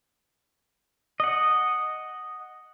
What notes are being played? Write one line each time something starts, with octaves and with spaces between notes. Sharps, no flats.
D#5 F#5